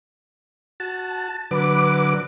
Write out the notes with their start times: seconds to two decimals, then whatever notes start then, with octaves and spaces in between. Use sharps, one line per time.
0.80 F#4 A5
1.51 D3 F#3 B4 D6